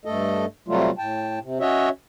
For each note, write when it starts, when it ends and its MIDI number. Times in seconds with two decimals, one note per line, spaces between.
0.05 0.45 43
0.05 0.45 57
0.05 0.45 69
0.05 0.45 75
0.68 0.91 48
0.68 0.91 54
0.68 0.91 55
0.68 0.91 57
0.68 0.91 65
0.98 1.39 45
0.98 1.39 79
0.98 1.39 81
1.42 1.58 48
1.60 1.89 61
1.60 1.89 66
1.60 1.89 73
1.60 1.89 75
1.60 1.89 76